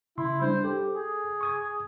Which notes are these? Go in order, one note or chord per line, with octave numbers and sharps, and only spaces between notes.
C#3 E4 C6
G3 D4 C5
G4 A4
G#4
C#6 D#6 G#6